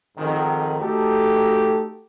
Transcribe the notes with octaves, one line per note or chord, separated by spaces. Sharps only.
F2 G#2 D#3
A3 D#4 F#4 G4 A4